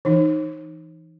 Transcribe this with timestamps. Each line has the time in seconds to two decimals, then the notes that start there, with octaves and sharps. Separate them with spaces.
0.05 E3 D#4